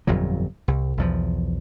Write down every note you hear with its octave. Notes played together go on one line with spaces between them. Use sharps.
G1 F2 A#2 F#3
C2
B1 E2 F3